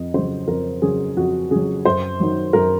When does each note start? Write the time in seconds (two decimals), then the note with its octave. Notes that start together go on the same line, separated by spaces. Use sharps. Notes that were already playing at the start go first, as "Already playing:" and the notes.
Already playing: F2 D#5
0.14 C#3 F#3 C5
0.48 F2 A#4
0.82 C#3 F#3 G#4
1.16 F2 F#4
1.51 C#3 F#3 G#4
1.85 F#2 C5
2.20 D#3 F#3
2.53 F#2 A#4